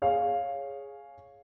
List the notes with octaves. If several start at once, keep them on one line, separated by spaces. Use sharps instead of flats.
G#4 C#5 F5